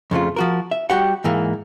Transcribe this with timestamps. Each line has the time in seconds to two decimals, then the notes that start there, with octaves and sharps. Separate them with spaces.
0.11 F2 C#3 A3 F4
0.36 F3 F#4 A#4
0.71 E5
0.90 G3 F#4 G4 F#5
1.24 G#2 E3 A#3